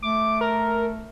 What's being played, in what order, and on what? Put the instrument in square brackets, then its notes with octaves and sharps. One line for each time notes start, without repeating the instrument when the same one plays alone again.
[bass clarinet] A3 [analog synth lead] D6
[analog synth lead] A#4